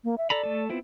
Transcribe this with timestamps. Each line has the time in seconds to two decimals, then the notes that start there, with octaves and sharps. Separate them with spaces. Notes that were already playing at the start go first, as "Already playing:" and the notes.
0.04 A#3
0.18 E5
0.30 A4 D5 A#5 B5
0.43 A3 A4
0.70 B3 C4 E4 F4